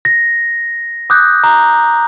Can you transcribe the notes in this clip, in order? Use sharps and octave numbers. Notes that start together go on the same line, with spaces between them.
A#6
D6 D#6 F#6 G6
A#5